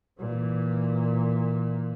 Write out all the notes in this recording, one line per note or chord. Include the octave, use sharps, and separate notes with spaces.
A#2 E3